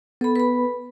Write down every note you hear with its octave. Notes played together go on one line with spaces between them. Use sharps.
B3 A4 B5
B4 B5